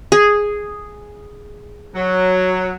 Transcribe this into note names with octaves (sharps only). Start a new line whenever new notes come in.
G#4
F#3